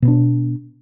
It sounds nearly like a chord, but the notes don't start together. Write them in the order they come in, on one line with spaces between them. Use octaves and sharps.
B2 B3 D4